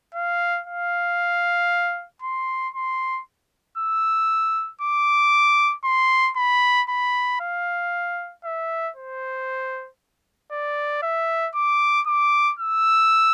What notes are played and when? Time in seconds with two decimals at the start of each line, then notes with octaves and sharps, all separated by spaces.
0.15 F5
0.67 F5
2.22 C6
2.74 C6
3.78 E6
4.81 D6
5.85 C6
6.37 B5
6.89 B5
7.41 F5
8.44 E5
8.96 C5
10.52 D5
11.03 E5
11.55 D6
12.07 D6
12.59 E6